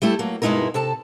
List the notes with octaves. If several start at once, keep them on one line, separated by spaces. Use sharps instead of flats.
G3 A3 E4 A4
F#3 A#3
G2 B2 G#3 D#4 E4 A#4
C3 A4 A5